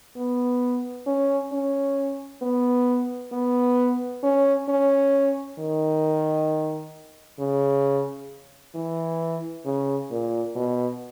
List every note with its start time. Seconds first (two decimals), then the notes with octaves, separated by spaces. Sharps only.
0.16 B3
1.06 C#4
1.52 C#4
2.42 B3
3.32 B3
4.23 C#4
4.69 C#4
5.59 D#3
7.39 C#3
8.75 E3
9.65 C#3
10.11 A#2
10.55 B2